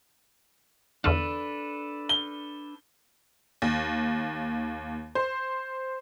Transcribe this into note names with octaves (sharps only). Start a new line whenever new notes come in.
E2 D3 D4 A4 B4 F5
G7
D#2
C5